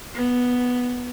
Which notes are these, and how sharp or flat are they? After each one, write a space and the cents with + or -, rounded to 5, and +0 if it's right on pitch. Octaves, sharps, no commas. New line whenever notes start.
B3 -5